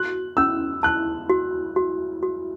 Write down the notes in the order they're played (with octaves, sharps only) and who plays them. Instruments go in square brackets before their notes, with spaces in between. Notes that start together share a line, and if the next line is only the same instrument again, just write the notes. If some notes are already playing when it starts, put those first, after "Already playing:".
Already playing: [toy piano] F#4 [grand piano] F#6
[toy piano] C#4 [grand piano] E6
[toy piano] A5 [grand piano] F#6
[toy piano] F#4
F#4
F#4